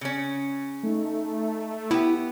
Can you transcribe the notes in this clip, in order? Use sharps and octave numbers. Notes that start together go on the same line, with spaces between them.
C#3 C#4
A3 D#4
B3 E4 G4